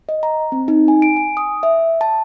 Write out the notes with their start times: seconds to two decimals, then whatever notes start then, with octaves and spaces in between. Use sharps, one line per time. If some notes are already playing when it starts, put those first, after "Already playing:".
0.09 D#5
0.23 A#5
0.52 C4
0.68 D#4
0.88 G#5
1.02 D7
1.17 G#5
1.37 D#6
1.63 E5
2.01 A5